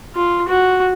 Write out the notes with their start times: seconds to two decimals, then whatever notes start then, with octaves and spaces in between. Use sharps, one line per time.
0.15 F4
0.48 F#4